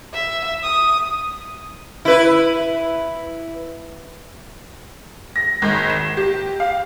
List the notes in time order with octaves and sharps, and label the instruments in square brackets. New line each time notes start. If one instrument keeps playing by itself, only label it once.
[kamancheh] E5
D#6
[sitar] E4 B4
[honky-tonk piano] A#6
G#1
E7
G4
F5